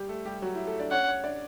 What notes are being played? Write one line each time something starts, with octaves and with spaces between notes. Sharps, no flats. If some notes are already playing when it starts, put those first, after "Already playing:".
Already playing: G3 G4
A3 A4
G3 G4
F#3 F#4
E4
A3 A4
D4 D5
C#4 C#5 F#5
C#4 C#5
D4 D5